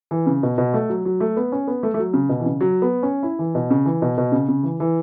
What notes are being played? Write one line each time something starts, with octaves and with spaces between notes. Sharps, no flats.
E3
C#3
B2
B2
A3
F#3
F#3
A3
B3
C#4
B3
A3
A3
F#3
C#3
B2
E3
C#3
F#3
B3
C#4
E4
E3
B2
C#3
E3
B2
B2
C#3
C#3
E3
E3